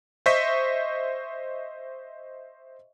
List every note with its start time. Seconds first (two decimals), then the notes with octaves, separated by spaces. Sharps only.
0.26 C5 D#5 E5 C#6 G6 B6